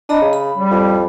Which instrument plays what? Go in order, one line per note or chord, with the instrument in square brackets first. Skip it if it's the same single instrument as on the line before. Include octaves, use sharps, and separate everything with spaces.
[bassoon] D4 [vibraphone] D#5 A#5 B5
[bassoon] C#3
[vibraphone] B5
[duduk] G3
[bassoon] F2